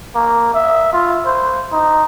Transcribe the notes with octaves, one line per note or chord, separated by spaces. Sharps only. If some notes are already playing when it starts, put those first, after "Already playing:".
A#3
E5
F4
C5
D#4